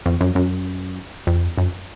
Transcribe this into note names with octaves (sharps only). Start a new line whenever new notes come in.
F2
F#2
F#2
F2
F#2